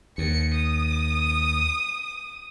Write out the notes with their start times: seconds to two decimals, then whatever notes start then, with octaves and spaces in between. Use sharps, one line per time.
0.18 D#2 C#7
0.56 D#6